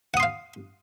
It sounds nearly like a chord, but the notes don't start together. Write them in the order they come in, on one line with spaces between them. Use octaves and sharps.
F#5 D#6 C6 F5